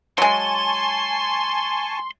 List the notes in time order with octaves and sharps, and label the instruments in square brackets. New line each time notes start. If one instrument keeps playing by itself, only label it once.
[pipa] F#3 G#3 [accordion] G#5 A5 C#6 [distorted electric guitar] C6